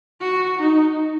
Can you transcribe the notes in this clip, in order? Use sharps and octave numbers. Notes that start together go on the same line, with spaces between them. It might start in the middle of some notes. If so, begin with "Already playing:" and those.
F#4
D#4